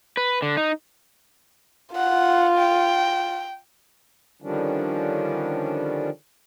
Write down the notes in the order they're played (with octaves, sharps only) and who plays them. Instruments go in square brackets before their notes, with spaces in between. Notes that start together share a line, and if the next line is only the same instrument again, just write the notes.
[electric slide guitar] B4
D3
D#4
[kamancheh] F4 [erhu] F#5
[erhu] G5
[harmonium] D3 D#3 F3 G3 C#4 D4